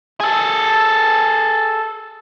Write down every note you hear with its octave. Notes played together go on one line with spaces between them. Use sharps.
G#4 A4